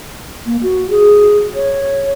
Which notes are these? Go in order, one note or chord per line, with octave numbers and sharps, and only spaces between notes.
A#3
F#4
G#4
C#5